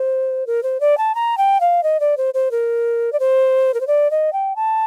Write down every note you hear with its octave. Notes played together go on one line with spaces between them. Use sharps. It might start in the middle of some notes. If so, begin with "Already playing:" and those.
Already playing: C5
A#4
C5
D5
A5
A#5
G5
F5
D#5
D5
C5
C5
A#4
D5
C5
A#4
C5
D5
D#5
G5
A5